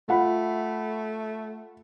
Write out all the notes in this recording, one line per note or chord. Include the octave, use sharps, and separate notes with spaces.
A3 F4 F#5 B5